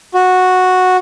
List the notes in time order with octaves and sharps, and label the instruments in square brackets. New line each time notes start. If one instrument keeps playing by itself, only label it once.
[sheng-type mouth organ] F#4